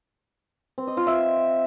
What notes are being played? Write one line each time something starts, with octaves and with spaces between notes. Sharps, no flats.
C4
D#5
F4
E5